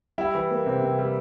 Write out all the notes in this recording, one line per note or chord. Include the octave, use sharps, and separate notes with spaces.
G3 E4
E3
A#3
C3
C3
G3